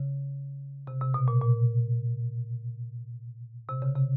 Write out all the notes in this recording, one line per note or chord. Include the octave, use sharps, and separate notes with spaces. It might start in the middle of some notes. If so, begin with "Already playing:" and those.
Already playing: C#3
C3
C3
B2
A#2
A#2
C3
C#3
C3